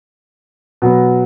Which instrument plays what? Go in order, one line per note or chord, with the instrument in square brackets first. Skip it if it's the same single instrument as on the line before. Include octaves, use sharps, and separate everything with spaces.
[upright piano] B2 F#3 B3